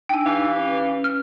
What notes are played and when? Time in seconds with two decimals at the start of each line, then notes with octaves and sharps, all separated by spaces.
0.09 D4 D#4 G5 G#5 E6
0.24 E3 G4 F5
0.53 C#4 B4
1.04 F6